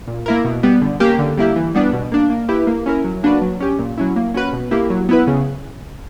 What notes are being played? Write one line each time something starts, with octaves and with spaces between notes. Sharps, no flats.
A#2
A#3 E4 A#4
B2
G3 B3
D3
A#3 C#4 G4
D3
G3 A#3 E4 G4
E3
G3 B3 D4
B2
A#3 D4
A#3
E4 G4 B4
A#3
C#4 E4 A#4
F#3
A#3 D4 F#4 B4
F#3
C#4 G4
A#2
F#3 C#4 E4
A#3
C#4 F#4 B4
B2
A#3 E4 G4
F#3
B3 E4 B4
C#3